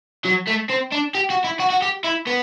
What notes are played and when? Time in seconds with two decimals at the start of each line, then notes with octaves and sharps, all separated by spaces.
0.25 F#3
0.47 A3
0.69 C4
0.92 D4
1.14 G4
1.30 F#4
1.44 E4
1.60 F#4
1.70 F#4
1.82 G4
2.04 E4
2.27 B3